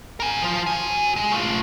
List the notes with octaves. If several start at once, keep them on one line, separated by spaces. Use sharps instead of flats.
A#4 G#5
F3 F4
F#4 G#5
G#3
A3 F4